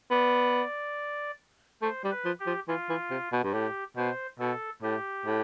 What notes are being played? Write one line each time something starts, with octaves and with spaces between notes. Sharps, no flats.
B3 D5
A3 C5
G3
B4
F3
G4
F3
E3 F4
E3
C3
B2
G2
A2 G4
B2 C5
B2 A4
A2 G4
A2